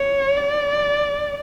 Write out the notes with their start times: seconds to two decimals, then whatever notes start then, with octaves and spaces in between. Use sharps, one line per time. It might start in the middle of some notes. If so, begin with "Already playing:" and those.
Already playing: C#5
0.37 D5